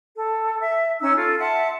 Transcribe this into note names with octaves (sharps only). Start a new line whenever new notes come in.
A4
E5
C#4 D#4 E6
F4 A4
E5 F#5 A5 C6